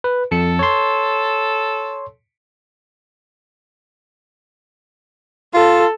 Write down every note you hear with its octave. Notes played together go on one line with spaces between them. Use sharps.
B4
F2 A4 C#7
C#5 C6
F4 A4